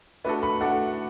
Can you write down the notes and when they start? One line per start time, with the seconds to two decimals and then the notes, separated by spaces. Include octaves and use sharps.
0.24 A3 D4 F#4 A4 B4
0.43 B5
0.60 A3 D4 F#4 A4 F#5